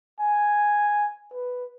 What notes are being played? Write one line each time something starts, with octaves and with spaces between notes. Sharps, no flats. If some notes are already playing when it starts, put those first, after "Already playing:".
G#5
B4